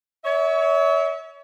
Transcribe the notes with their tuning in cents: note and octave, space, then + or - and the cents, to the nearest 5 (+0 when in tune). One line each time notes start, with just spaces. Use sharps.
C#5 +30 E5 -30